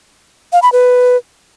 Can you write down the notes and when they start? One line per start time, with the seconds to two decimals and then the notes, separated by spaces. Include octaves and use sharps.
0.53 F5
0.63 B5
0.72 B4